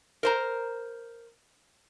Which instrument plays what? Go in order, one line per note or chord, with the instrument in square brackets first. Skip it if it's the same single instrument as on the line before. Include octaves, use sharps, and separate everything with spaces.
[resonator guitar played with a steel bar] A#4 C5 A#5